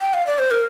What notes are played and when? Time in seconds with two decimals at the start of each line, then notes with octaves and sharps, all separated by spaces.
0.01 G5
0.14 F5
0.27 D5
0.39 C5
0.51 A#4